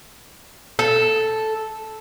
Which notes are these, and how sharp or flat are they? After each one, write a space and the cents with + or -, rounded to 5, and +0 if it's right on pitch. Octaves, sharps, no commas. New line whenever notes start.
A4 -5